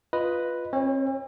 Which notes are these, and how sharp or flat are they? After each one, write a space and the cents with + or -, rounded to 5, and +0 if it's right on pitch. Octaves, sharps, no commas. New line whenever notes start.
F4 +0 B4 +0 D#5 +0
C4 +45 C#5 -10